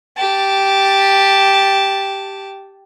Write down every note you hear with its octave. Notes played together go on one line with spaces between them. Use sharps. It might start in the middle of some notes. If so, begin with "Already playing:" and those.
G4 A5